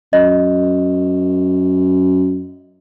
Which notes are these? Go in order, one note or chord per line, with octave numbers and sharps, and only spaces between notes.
F#2 D#5